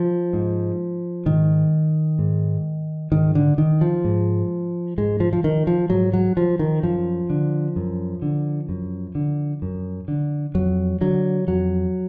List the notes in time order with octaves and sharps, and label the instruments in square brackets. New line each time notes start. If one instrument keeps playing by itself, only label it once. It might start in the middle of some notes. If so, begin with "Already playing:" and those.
Already playing: [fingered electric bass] F3
G#2
G#2 D#3
G#2
G#2 D#3
D3
D#3
F3
G#2
G#2 G#3
F3
F3
D#3
F3
G#2 F#3
F#3
F3
D#3
F#2 F3
D3
F#2
D3
F#2
D3
F#2
D3
F2 F#3
D3 F#3
F2 F#3